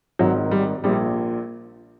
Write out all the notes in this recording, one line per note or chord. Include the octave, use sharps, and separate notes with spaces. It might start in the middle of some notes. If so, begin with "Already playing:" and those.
G#1 G#2 D#3 F#3
G3
A#1 A#2 G3